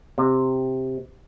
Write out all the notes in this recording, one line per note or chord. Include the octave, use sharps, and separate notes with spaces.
C3